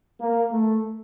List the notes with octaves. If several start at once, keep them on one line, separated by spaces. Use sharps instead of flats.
A#3
A3